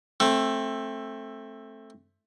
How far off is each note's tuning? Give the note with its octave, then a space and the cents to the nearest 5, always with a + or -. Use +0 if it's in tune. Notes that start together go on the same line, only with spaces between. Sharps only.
A3 +0 C4 +20